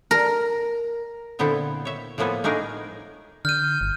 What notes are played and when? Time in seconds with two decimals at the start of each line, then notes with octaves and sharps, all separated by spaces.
0.11 A#4
1.39 A#2 D3 B3 C4 E4 A4
1.85 C#5 E5
2.18 A2 F3 A#3 B3 A4 G#5
2.44 A3 D4 D#4 G#4 A#4
3.45 D3 F6 G6 D#7
3.81 G1